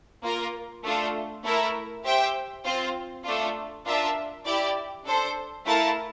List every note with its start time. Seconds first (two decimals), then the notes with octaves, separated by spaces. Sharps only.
0.23 A#3 F4 A#4
0.83 A3 D4 F4
1.43 A3 E4 A#4 E5
2.04 G4 C5 E5 G5
2.65 C4 F4 C5
3.24 A3 D4 F4
3.85 D4 F4 A#4 E5 A5
4.45 E4 G4 D5
5.05 D4 A4 C5
5.65 A3 E4 A#4 F5 A5